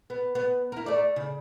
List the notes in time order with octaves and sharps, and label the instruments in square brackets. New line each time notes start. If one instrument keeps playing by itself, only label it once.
[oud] B3
B3
E4 A#4
A3 D5
C#3